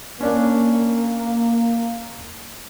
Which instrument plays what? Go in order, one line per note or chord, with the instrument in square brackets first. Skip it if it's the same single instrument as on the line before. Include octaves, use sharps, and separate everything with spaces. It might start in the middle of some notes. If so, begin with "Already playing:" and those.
[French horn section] A#3 [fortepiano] C#4 D4